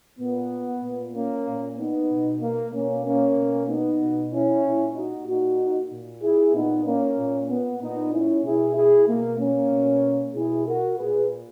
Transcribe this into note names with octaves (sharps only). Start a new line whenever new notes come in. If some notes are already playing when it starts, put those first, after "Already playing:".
A#2 B3
A#2
A#3 C#4
A#2
B3 D#4
B2
A#3
B2 A#3 C#4
A#3 C#4
B2
B3 D#4
B2
C#4 E4
A#2
D#4 F#4
A#2 D#4 F#4
A#2
E4 G#4
A#2 B3 D#4
A#3 C#4
A#2
B3
A#2 B3 D#4
C#4 E4
B2 E4 G#4
E4 G#4
B2 A#3
A#3 C#4
B2
B2 E4 G#4
F#4 A#4
A#2 G#4 B4